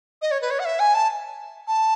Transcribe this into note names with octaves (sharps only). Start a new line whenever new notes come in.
D#5
C#5
B4
C#5
F#5
E5
G#5
A5
A5